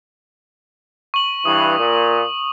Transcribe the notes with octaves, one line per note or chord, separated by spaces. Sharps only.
C#6 F#7
G2 E3 D#6
A#2